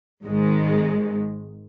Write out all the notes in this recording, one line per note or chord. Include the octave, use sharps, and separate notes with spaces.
G#1 G#2 D#3 G#3